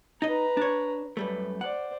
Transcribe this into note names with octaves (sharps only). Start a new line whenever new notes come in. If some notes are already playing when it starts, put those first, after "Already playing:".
D#4 B4 D#5 A#5
D4 C#5
F#2 G3 A3 B4
C5 D5 F#5